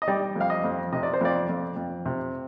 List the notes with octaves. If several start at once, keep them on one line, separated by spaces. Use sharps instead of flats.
D#5
G3 D5
F2 F5
D#5
F2
C3 D#5
D5
C5
F2 D5
F2
F2
C3